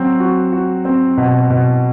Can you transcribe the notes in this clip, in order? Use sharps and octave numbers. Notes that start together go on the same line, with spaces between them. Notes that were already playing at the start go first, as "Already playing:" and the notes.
Already playing: F#3 C4
F#4
F#4
C4
B2
B2